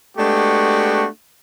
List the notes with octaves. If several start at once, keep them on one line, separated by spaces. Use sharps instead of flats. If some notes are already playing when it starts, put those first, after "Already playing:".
G#3 A3 B3 D4 F#4 G4